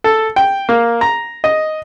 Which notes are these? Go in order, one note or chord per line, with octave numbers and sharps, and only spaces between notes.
A4
G5
A#3
A#5
D#5